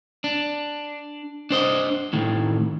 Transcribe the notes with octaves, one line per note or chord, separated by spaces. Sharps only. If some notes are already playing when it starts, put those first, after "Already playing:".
D4
D4 C5 D#5
A2 D#3